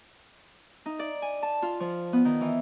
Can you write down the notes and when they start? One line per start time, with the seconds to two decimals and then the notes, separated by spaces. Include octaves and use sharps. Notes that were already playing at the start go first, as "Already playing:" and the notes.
0.86 D#4
0.99 D5
1.22 G#5
1.43 A5
1.62 F4
1.80 F3
2.13 B3
2.25 D#3
2.41 E3